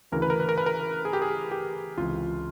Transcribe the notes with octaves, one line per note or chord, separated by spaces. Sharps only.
D2 C#3 E3 A#4
B4
A#4
B4
A#4
B4
A#4
G#4
G4
G#4
G4
C#2 C3 E3 F4